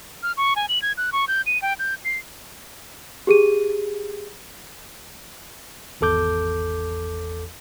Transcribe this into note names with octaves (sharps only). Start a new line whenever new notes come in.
F6
C#6
G#5
F#7
G#6
F#6
C#6
G6
D#7
G5
G6
C7
G4 G#4 D#7
G#1 E2 A4 D6 G6